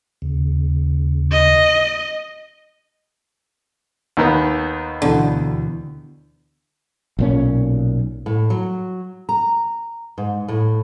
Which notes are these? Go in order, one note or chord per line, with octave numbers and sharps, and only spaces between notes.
D#2 C#3
D#5
D#2 D#3 B3
D2 B2 D3 E3
B1 A#2 C#4
A2
F#3
A#5
G#2
A2